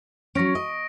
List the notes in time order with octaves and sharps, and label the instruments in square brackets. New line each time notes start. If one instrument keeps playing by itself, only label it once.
[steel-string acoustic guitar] F#3 C#4 [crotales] C#6 A#6 D7
[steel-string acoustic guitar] D#5